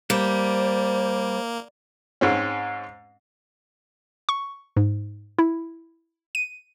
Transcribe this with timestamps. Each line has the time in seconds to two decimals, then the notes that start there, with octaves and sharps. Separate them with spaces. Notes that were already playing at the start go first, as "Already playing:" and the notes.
0.10 G3 A#3 C5
2.21 G#2 C4 C#4
4.29 C#6
4.77 G#2
5.39 E4
6.35 D#7